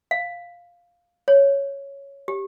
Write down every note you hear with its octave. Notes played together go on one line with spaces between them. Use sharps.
F5
C#5
G4